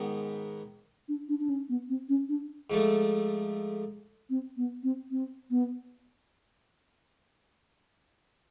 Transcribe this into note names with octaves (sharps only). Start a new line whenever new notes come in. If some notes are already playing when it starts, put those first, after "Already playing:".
Already playing: G#2 D#3 G#3 B3
D4
D4
D4
C#4
B3
C4
C#4
D4
G#2 F3 A3
C4
B3
C4
C4
B3